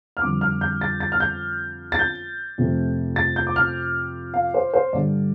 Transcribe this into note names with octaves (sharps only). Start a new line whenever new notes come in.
F6
F2 D3 G3 D6
F6
G6
A6
A6
F6
G6
A6
G6
F2 C3 A3
A6
G6
D6
F6
F5
C5
C5
G2 D3 G3 D5